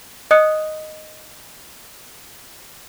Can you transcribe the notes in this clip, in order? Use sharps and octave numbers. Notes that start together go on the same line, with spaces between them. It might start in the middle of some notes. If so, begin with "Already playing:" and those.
D#5 D#6 F#6 C#7